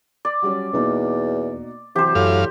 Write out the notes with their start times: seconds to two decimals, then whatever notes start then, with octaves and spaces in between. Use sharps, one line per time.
0.25 D5
0.42 F#3 G3 C#4
0.73 E2 B2 A#3 D#4
1.96 C3 E3 F#3 G4 C5
2.15 F#2 A2 F5